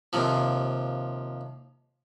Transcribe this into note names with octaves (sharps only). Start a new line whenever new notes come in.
D#2 C3 F3